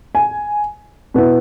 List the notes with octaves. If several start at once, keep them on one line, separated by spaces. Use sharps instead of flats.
G#5
B2 B3 E4